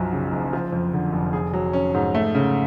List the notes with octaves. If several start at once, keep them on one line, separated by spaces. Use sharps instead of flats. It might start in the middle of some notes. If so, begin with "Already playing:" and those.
Already playing: B1 F#2 F3
C#3
F#1
F3
F2
D3
F1
G#4
F#3
C#4
G#2
A3
C#3